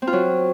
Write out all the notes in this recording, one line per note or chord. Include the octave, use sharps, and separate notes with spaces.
C4
F4
F#3